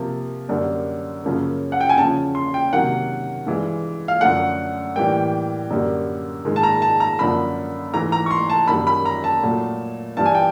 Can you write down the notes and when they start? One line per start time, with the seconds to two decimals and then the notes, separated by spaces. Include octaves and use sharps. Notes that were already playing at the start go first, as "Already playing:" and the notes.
Already playing: C3 F3 A#3
0.49 F#2 D3 G3 A#3
1.24 F#2 C#3 F3 A#3
1.72 F#5
1.81 G5
1.89 G#5
1.98 E2 C#3 F3 A5
2.35 C6
2.54 G5
2.73 C3 D#3 F#3 A#3 F#5
3.46 G2 E3 G#3
4.08 F5
4.21 F#2 D3 F3 A3 F#5
4.96 A2 E3 G3 A#3 G5
5.70 F#2 D3 G3 A#3
6.45 G#2 D#3 G#3
6.56 A5
6.63 A#5
6.82 A5
7.00 A#5
7.19 F#2 D3 F3 A#3 B5
7.93 G#2 E3 A3 A#5
8.12 A#5
8.26 C#6
8.31 C6
8.50 A5
8.68 F#2 D#3 G3 A#3 B5
8.87 B5
9.05 A#5
9.24 A5
9.43 A#2 F#3 A3
10.17 G2 E3 G3 A5
10.26 G#5
10.35 G5